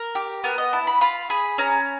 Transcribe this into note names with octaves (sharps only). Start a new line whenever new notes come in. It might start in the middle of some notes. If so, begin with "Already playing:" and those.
Already playing: A#4
G4
B3 A#4
D#5
E4 A5
B5
F4 B5
G#4 B5
C#4 A#5